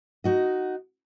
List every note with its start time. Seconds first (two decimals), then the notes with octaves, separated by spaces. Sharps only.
0.24 D#4 F#4 D#5